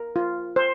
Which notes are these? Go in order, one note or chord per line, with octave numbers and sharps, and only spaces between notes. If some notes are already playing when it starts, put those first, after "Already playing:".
Already playing: A#4
F4
C5